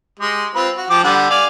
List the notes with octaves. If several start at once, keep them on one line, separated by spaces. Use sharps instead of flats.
G#3 G4
C4 F4 B4
F#4
F3 G5 D6
D3 G3 F#5
D5 F5 G#5